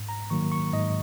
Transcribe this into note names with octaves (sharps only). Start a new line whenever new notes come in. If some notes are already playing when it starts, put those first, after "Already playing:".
Already playing: G#2
A#5
D#3 F#3 A#3 C#6
C#6
G#2 D#5